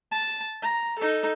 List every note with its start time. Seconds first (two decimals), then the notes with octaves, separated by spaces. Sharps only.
0.12 A5
0.62 A#5
0.99 D#4 A4